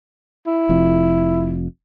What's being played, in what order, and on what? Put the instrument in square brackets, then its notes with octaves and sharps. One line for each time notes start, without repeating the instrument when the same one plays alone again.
[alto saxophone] E4
[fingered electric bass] F1 F2